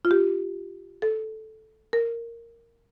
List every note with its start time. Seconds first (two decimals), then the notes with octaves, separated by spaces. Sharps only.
0.05 F4
0.11 G4
1.02 A4
1.93 A#4